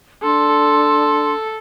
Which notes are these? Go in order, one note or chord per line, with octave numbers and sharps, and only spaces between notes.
D4 A4 C6